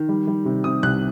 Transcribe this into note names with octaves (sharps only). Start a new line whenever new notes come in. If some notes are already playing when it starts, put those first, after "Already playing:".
Already playing: D#3
G3
G3
C3
C3 D#6
C2 F#6